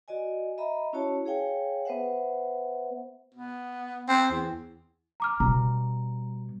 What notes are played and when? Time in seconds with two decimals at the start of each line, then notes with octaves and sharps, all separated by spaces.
0.08 F#4 D5 D#5 G#5
0.58 D#5 E5 A#5 B5
0.93 C#4 E4 F#4 C#5 A5
1.26 G#4 C#5 F5 G5 G#5
1.85 B3 B4 C5 E5 F#5
3.34 B3
4.08 C4
4.31 E2
5.20 A#5 D6 F6
5.40 B2 G3 A#5